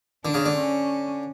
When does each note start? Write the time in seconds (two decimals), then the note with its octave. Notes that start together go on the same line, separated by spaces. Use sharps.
0.24 D3 D4
0.34 C#3
0.45 D3
0.56 C#4